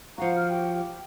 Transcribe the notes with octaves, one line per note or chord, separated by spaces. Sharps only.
F3 F#4 F5 F#5 A#5
F6
G4 G5
G4